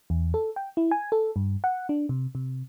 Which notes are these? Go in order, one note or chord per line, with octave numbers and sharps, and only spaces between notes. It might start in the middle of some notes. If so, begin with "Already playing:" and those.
E2
A4
G5
E4
G#5
A4
G2
F#5
D4
C3
C3